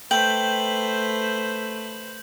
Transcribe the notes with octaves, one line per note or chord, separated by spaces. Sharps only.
A3 B4 C5 G5 G6 F#7